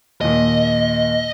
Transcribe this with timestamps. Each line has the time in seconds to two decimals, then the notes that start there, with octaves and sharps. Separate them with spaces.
0.21 D#2 A#2 D#5